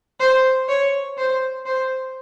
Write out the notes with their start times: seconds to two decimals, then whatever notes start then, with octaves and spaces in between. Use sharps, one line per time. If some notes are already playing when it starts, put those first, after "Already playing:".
0.20 C5
0.68 C#5
1.18 C5
1.66 C5